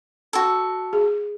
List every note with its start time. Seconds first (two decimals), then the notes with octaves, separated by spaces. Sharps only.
0.33 F#4 A4
0.93 G#4